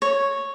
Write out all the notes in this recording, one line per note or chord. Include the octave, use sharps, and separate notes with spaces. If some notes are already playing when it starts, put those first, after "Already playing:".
C#5